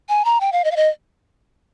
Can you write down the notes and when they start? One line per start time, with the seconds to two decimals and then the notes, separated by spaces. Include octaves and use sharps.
0.09 G#5
0.25 A#5
0.41 G5
0.52 F5
0.64 D#5
0.71 F5
0.76 D#5